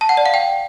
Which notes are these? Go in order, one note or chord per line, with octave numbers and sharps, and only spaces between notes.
A5
F#5
D5
F5
G5